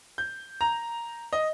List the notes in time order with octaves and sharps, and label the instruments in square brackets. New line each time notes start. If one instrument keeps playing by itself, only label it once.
[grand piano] G6
A#5
D#5